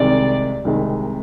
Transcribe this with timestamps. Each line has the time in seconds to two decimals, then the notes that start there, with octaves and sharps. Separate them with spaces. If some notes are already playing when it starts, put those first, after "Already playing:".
Already playing: C2 C3 D#3 G#3 D5
0.65 C2 C3 D#3 G#3